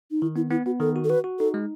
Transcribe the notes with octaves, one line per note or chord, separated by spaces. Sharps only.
D#4
D#3 E4
B3 E4
B3 E4
B3 F#4
D#3 A4
F#4
A4
F#4 B4
F#4
D#4 A4
G#3